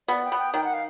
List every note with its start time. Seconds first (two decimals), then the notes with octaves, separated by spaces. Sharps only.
0.08 B3 D5
0.25 G5
0.32 B3
0.39 G5
0.54 D#3 G5
0.64 F#5
0.74 F5